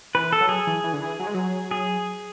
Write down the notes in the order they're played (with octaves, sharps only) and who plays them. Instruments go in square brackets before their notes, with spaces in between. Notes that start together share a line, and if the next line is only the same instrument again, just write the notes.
[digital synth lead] E3 [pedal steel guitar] B4
[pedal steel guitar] A4
[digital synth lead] F#3
[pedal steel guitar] G#4
[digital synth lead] E3
E3
D3
E3
F#3
G#3
F#3
[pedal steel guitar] G#4